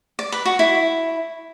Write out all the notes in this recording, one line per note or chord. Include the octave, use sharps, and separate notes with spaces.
D5
B4
F#4
E4